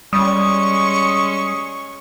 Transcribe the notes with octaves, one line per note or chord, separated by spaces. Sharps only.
G3 G#3 C#4 C#6 D#6